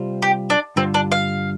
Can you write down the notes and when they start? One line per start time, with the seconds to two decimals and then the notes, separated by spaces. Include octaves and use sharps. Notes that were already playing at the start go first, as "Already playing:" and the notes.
Already playing: C3 G3 C4 F4 C5
0.22 G4
0.50 D4
0.76 G2 D3 G3 C4 F4
0.94 D4
1.12 F5